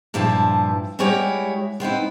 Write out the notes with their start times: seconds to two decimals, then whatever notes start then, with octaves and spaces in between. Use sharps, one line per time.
0.14 G2 A#2 F3 E4 A5
0.99 G3 G#3 E4 F#4 G4 C#5
1.80 B3 C4 D#4 E4